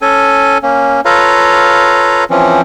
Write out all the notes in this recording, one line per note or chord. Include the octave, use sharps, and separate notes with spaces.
C#4 A4 G#5
A#3 C#4
F4 A4 B4 C#5 F5 A#5
E3 F3 C4 C#4